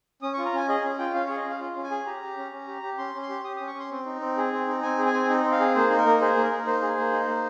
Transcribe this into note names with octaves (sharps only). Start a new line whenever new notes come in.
C#4 D#6
F4 C#6
A#5
C#4 G#5
G#4 D#5
C#4
F4 G5
C#4 F5
G#4 C#5
D#5
C#4 F5
F4
C#4
G#5
G#4
G4 A#5
G4
C#4
C#4
G4
G4
C#4 C6
C#4
C6
G4
G4 D#6
C#4 D#6
C#6
C#4 C6
C4
D#4
C4
G#4
C4
D#4
C4 G#5
G#4
G#5
C4
D#4
C4
F5
G#4
A#3 C5
D#4
A#4
A#3
G#4 C5
A#3
A#4
D#4
A#3 C5
G#4
A#3
D#4
A#3